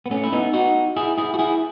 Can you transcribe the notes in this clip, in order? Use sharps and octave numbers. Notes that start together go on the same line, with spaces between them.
B3
A3 C#4
E4
B3 D#4
D#4 F#4
E4 G#4
E4 G#4
F#4
E4 G#4